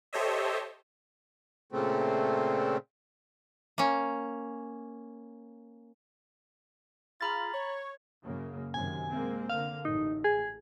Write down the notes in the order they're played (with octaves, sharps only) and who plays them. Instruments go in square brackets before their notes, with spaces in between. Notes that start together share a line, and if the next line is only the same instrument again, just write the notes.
[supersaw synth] G4 A4 C5 C#5 D#5 E5
[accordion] A#2 C#3 A3 C4
[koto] A#3 C#4
[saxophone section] F4 G#4 [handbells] A#5 B5 A6
[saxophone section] C#5
[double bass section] F#2 C#3 A#3
[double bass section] F#2 C3 D#3 [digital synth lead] G#5
[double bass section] G#3 A#3 C4
[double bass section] D3 A#3 [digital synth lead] F5
[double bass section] A1 [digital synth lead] D#4
[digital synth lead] G#4